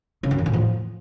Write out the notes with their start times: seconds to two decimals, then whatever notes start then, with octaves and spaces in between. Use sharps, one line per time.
0.23 C#3
0.31 F#2
0.38 E2
0.46 A2
0.53 F3